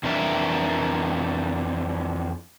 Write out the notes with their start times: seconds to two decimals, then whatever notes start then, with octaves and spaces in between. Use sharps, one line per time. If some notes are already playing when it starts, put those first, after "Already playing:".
0.03 F2 E3 D4 A#4 E5